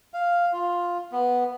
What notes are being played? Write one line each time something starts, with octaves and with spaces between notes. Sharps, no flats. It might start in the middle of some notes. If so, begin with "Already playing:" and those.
F5
F4
B3